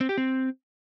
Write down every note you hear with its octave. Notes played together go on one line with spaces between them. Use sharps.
C4
G4
C4